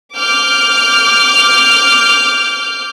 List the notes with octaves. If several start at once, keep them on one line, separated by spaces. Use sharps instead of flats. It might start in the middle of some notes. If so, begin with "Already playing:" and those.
D6 F6 G6